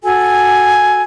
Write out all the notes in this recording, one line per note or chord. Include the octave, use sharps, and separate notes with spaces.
F#4 A4 G#5